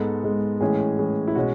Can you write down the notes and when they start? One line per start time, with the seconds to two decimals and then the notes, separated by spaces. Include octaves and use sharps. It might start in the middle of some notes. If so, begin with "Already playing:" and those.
Already playing: G#2 G#3 B3 A4
0.23 G#2 G#3 B3
0.61 A2 E3 G#3 C#4 G#4
0.99 A2 E3 G#3 C#4
1.28 E4
1.35 B2 G#3 C#4 F#4